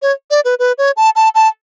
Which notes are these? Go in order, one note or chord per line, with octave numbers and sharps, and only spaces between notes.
C#5
D5
B4
B4
C#5
A5
A5
A5